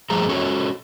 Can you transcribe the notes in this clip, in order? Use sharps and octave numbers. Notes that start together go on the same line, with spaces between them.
G2 F3 A3 G#4 A#5
C#4 F#4 A4 C#5